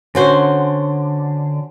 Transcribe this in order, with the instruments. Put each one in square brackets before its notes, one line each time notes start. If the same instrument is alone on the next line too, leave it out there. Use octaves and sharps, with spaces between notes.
[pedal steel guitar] D3 [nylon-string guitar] C#4 F#4 C5